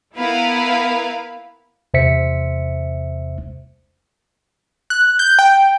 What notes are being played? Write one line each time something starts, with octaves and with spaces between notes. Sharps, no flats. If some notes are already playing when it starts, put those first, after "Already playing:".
B3 E4 A#4 B4 F5
E2 C3 C5 E5 B6 C#7
F#6
G6
G5